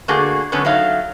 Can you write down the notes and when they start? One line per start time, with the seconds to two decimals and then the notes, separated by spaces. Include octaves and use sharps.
0.08 D3 A3 A#3 F#4 G#4
0.52 D3 F#3 B3 C#4
0.65 F#3 A3 D#4 F5